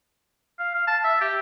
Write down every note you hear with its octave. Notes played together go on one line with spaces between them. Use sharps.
F5
F5
A5
E5
G4